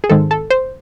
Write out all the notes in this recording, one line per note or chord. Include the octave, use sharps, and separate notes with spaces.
G#4
G#2 D#3 G#3 C4 A4
A4
C5